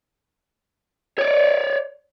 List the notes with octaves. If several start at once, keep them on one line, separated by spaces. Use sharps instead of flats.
C#5 D5